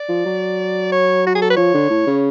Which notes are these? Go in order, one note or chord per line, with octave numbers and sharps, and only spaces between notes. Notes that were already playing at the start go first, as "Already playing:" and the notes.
Already playing: D5
F3
F#3
C#5
F#4
G#4
A4
B4
F3 C#5
D3
A2
C#3